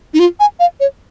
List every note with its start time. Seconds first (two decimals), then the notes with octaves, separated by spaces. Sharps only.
0.14 D#4
0.19 F4
0.40 G#5
0.60 F5
0.80 C#5